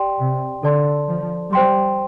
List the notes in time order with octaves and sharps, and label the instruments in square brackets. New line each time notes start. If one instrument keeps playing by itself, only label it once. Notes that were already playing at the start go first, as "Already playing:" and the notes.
Already playing: [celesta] G4 D5 G5 C6
[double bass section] C3
[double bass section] D3 [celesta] A4 D5 A5 C6
[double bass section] F3
[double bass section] G3 [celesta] C5 G5 C6